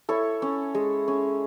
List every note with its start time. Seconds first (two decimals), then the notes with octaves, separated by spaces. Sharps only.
0.09 E4 A4 C#5
0.42 C#4
0.75 G#3
1.08 C#4